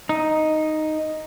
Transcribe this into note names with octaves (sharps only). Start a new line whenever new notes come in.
D#4